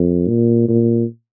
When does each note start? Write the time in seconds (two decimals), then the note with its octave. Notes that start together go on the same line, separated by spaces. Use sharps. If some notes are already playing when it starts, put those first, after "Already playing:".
Already playing: F2
0.28 A#2
0.69 A#2